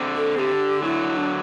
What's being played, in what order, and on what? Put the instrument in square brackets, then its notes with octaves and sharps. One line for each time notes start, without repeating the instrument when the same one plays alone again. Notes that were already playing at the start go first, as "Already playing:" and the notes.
Already playing: [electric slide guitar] D3 C4
[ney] A4
[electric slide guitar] D3 [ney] G4
[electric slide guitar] F#3 [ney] E4
[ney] D4